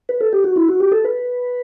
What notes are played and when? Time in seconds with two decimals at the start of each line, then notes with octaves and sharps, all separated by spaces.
0.09 B4
0.21 A4
0.33 G4
0.44 F#4
0.56 E4
0.68 F#4
0.80 G4
0.92 A4
1.05 B4